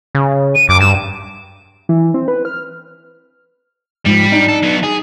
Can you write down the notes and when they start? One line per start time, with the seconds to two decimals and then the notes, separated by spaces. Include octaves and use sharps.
0.15 C#3
0.55 D#7
0.69 F#2 D6
0.80 G2 E7
1.89 E3
2.14 C4
2.28 B4
2.45 F6
4.06 G#2 F3 G3
4.32 D4 D#4
4.48 A4
4.63 F#3 B3
4.83 G#4